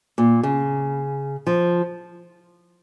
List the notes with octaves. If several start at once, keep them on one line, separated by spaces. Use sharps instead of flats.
A#2
C#3
F3